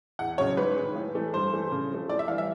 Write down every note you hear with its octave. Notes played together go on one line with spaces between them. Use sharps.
E2 F#5
C#3 F#3 C#5
G#2 B4
D#3 G#3
A2
E3 A3
G2 C5
E3 A3
C#3
F3 A3
A2 D5
E5
E3 G3 F5
E5